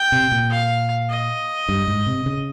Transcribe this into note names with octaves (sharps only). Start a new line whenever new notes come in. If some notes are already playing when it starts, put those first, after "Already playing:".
Already playing: G5
C3
A#2
F5
D#5
G2
G#2
C3
C#3